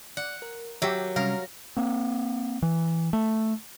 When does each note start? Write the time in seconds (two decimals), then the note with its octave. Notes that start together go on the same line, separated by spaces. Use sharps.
0.17 D5 F#5
0.42 A#4
0.82 F#3 G4 E5
1.16 C3 G3 C#4 A#4 F5
1.77 A#3 C4
2.62 E3
3.13 A3